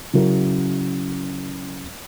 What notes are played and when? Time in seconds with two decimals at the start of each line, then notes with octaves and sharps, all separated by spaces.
0.13 C#3 F#3 C#4 E4 A#4